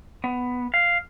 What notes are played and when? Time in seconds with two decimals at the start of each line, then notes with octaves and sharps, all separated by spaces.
0.24 B3
0.74 F5